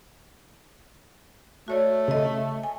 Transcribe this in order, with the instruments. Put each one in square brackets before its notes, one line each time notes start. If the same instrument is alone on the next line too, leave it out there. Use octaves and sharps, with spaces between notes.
[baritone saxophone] A3 [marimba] F#4 C#5 D5
[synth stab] C#3 [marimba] A4 D#5
[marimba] G#5